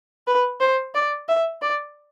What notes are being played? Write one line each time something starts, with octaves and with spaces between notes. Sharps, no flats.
B4
C5
D5
E5
D5